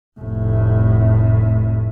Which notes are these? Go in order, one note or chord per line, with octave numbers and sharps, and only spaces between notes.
F1 A2